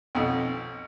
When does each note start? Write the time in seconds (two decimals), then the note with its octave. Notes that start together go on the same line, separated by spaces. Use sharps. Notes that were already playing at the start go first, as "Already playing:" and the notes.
0.15 B1 F2